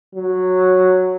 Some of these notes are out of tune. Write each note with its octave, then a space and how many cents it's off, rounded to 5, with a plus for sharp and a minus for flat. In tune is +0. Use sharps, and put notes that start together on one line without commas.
F#3 -5